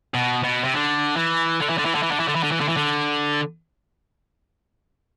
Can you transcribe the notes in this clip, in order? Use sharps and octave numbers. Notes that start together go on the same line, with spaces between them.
B2
B2
C3
D3
E3
D3
E3
D3
E3
D3
E3
D3
E3
D3
E3
D3
E3
D3
E3
D3